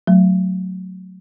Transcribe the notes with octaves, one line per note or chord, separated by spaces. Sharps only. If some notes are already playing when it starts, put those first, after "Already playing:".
F#3 A3